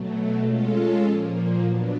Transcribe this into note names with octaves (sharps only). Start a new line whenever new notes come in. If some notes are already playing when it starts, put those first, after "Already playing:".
Already playing: B2 F#3 A3
G#3 C#4 F4 A4
A#2 F3 A#3
F#3 B3 D4